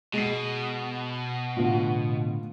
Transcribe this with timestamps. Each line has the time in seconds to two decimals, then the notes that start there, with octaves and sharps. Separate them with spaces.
0.13 B2 G#3 C7
1.57 A2 D3 B3 F4